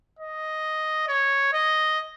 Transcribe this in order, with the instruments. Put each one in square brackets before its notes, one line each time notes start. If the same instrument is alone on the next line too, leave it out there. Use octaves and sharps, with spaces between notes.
[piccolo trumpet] D#5
C#5
D#5